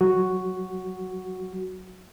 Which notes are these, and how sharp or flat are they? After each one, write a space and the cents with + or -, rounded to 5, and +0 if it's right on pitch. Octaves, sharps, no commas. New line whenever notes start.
F#3 +0 F#4 +0